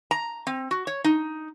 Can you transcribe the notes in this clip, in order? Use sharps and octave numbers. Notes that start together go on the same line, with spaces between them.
A#5
C4
F#4
C#5
D#4